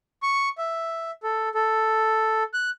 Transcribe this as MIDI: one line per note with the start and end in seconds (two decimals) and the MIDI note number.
0.23 0.49 85
0.58 1.11 76
1.23 1.49 69
1.55 2.43 69
2.54 2.70 90